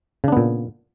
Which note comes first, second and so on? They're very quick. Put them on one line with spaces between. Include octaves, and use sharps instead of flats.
C#3 D4 B3 A#2